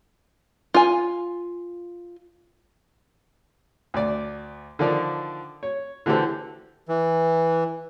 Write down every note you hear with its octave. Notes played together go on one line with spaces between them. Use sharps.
F4 G#5
D2 D5
D3 D#3 F3 D5
C#5
D3 E3 F#4 G4 A4 C5
E3